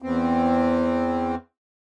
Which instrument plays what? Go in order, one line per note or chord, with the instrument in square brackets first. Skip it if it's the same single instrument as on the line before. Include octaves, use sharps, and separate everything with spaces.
[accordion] E2 C4